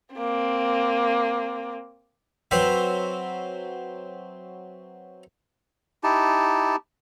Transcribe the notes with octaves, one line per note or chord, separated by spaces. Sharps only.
A#3 C4
F#3 C4 F#4 B4 C5 E5
D#4 E4 G4 A5